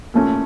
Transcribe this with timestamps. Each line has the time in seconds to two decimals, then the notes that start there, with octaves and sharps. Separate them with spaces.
0.14 A#2 A3 C#4